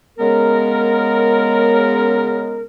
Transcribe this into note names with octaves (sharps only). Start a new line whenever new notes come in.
C#3 G#3 B3 A#4